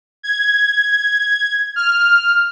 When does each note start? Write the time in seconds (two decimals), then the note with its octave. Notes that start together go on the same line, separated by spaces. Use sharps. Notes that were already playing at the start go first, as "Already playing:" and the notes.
0.23 G#6
1.76 F6